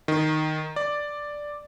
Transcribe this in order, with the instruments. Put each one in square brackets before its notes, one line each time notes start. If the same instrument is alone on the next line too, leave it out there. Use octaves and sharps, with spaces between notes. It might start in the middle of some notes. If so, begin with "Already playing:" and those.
[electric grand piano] D#3
D5